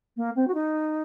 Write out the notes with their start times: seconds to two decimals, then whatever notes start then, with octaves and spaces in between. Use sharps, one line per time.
0.17 A#3
0.36 C4
0.47 F#4
0.54 D#4